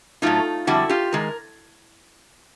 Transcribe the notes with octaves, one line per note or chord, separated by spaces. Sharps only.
A2 F#3 A3 D#4 F4
F2 D3 G3 E4 F#4
F4 G4
D#3 G#3 A#4